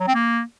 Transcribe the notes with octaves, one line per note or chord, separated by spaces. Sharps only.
F#3
C4
A#3